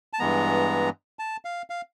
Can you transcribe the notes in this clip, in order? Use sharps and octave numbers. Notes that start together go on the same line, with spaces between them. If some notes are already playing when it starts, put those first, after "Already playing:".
A5
G2 E3 G#3 B3 A#5
A5
F5
F5